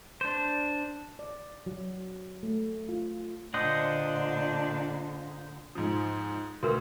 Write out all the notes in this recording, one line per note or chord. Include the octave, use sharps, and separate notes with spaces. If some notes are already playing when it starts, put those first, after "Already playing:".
D4 C5
D5
F#3
A3
F4
A#2 D3 D4 C5 D#5 F#5
G#2 F3
D2 F#4 A#4 B4